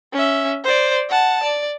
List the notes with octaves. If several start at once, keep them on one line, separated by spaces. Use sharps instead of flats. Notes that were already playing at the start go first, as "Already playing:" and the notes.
C#4 E5
C5 D5
F#5 A5
D5